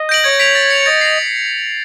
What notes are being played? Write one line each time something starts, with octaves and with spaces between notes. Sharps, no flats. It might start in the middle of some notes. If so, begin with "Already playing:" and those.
Already playing: D#5
G6 A#6 D7 F#7
C#5 G#6
B6 D7 F7
A6
C#7 F7
D#5 A6
C7 F7